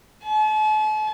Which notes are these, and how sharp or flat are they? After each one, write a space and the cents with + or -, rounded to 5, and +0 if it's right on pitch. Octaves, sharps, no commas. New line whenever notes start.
A5 -45